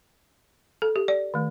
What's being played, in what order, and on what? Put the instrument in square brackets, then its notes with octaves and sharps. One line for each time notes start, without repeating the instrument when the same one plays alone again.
[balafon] A4
G4
D5
D#3 A3